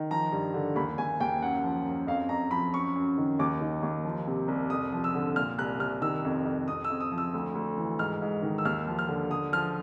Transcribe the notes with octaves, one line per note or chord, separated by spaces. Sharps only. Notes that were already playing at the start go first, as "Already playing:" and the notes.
Already playing: D#3
F3 A#5
G2
D3
D#2 B5
D#2 G#5
D#2 G5
F#2 F#5
F3
F#2
F2 F5
F2 A#5
F3 B5
F#2 C#6
F#2
D#3
D#2 D6
D#3
D#2
F3
C3
C2
F2 D#6
F3
E6
D3
A#2 F6
C2 F#6
C2 F6
D#3 E6
F2
F2
F2 D#6
E6
F2
D#6
F3
E6
D2
D2
E3
G#2 F6
G#2
D#3
E6
D#2 F6
F3
F6
D3
D3 D#6
F3 F6